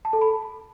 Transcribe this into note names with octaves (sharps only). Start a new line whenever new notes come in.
A5
A4
B5